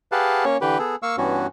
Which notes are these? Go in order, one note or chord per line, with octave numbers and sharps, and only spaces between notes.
G4 G#4 B4 F5 F#5 A5
A#3 C#4 C#5
D3 E3 G4 B4
B3 G#4 A4
A#3 F5 C#6 E6
G2 E3 B3 C#4 F#4